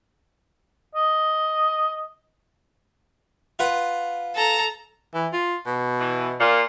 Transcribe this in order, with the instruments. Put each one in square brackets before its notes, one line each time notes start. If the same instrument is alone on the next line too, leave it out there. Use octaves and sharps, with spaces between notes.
[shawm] D#5
[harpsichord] F4 B4 F#5
[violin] A4 A#5
[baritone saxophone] E3
F4
B2
[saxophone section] E3
A#2